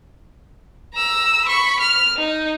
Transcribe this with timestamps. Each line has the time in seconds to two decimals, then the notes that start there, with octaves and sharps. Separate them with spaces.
0.94 A#5 E6
1.45 B5 C#6
1.80 F6
2.17 D#4